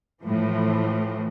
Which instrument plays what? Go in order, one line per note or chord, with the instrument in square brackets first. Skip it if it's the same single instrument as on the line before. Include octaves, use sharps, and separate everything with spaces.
[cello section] A2 E3 F3